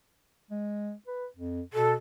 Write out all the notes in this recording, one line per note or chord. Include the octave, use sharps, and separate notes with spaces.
G#3
B4
F2
B2 A4